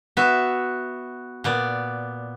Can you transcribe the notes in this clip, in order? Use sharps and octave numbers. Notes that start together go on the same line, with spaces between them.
B3 F#4 E5
A#2 B3 D5